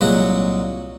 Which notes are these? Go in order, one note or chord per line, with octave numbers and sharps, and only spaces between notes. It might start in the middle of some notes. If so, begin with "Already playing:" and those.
C2 A#2 F#3 G#3 F#4 F#5